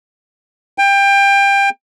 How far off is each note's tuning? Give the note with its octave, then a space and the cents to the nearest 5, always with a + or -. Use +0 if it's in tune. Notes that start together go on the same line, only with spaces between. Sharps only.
G5 +25